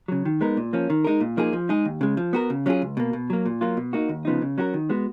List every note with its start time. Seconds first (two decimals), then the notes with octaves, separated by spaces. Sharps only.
0.08 C#3 F#3
0.25 D#3
0.41 G#3 B3 D#4 A#4
0.57 A#2
0.73 F3 A#3 C#4
0.90 D#3
1.04 G#3 D#4 A#4
1.21 A#2
1.37 F3 A#3 D#4 G#4
1.53 F3
1.69 G#3 D#4 G#4
1.85 D#2
2.01 C#3 G#3
2.17 F3
2.33 B3 F#4 A#4
2.50 C#3
2.66 F#3 C#4 F4 G#4
2.82 C#2
2.97 B2 A#3
3.13 B2
3.30 F#3 A#3
3.46 A#2
3.61 F#3 A#3 F4
3.77 B2
3.93 A#3 D#4 F#4
4.09 D#2
4.25 C#3 F3 B3 D#4
4.42 C#3
4.58 F#3 C#4 F#4 A#4
4.74 D#3
4.89 G#3 B3 F#4